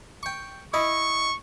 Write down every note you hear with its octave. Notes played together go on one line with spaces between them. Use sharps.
G5 C#6
E4 D#5 C#6